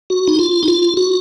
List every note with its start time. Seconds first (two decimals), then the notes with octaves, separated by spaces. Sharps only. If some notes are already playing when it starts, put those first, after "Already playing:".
0.10 F#4
0.28 D#4
0.39 F4
0.63 D#4
0.68 F4
0.97 F#4